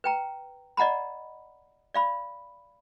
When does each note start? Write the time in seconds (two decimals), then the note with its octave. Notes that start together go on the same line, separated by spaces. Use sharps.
0.04 B4 G5 A#5
0.77 D5 D#5 F#5 A#5 B5
1.94 D5 F5 B5